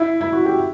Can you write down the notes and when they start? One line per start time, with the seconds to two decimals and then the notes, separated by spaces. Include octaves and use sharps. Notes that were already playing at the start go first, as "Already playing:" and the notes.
Already playing: E4
0.21 E4
0.33 F#4
0.45 G4